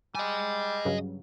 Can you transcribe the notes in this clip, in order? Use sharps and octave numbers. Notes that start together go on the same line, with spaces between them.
G3 D#5 G#5
G2 C#3 F#3